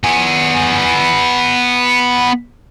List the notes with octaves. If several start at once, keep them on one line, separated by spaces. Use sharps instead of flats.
B3 G#5